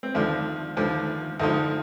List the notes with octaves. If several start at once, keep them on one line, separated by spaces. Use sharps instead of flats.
C4
D#2 D3 F3 D4
D#2 D3 F3
D2 D3 F3 D#4